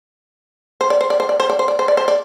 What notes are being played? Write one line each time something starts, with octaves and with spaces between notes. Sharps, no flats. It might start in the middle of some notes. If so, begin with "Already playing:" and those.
C5
D5
C5
D5
C5
D5
C5
D5
C5
D5
C5
D5
C5
D5